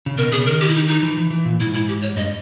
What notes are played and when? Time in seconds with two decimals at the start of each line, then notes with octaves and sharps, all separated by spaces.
0.06 C#3
0.18 B2 A#4
0.32 C#3 G#4
0.46 D#3 A#4
0.61 G4
0.68 E4
0.75 D#4
0.89 D#4
1.03 E3
1.17 E3
1.31 E3
1.45 A#2
1.60 G#2 E4
1.74 E4
1.88 G4
2.02 C#5
2.16 G2 D#5